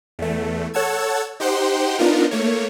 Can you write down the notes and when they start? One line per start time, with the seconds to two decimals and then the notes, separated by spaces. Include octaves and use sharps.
0.19 E2 A3
0.74 A4 C#5 F#5 A5 E6 G#6
1.40 D#4 G4 C5 F#5 G5 C6
1.98 B3 D4 D#4 F4 A#4
2.31 A3 A#3 C#5